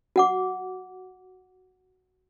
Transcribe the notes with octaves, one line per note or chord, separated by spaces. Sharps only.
F#4 F#5 D6